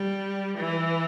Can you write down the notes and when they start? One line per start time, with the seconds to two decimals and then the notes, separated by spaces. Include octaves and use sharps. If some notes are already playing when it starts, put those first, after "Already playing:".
Already playing: G3
0.57 E3